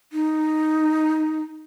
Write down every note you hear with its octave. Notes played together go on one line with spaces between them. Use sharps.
D#4